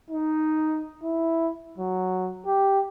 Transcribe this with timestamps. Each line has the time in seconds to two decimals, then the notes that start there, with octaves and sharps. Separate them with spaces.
0.11 D#4
1.04 E4
1.78 F#3
2.47 G4